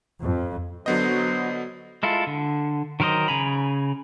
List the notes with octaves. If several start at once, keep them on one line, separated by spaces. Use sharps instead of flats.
F2
D3 F#3 B3 C5 D#5
G#3 E4 F4 A4
D3
D#3 F#3 A#4 C5 D#5
C#3 G#5 A#5 B5